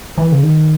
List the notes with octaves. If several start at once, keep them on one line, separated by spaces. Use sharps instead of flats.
E3
C#3
D#3